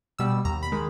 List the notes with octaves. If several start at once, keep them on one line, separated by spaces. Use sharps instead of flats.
B2 G3 E6
D#2 A#5
B5
D#3 G#3